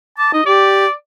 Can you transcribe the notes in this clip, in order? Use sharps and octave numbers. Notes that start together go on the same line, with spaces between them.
A5 D6
D#4 D#5
G4 D5